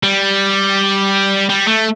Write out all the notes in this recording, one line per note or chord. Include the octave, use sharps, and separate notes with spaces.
G3
G3
A3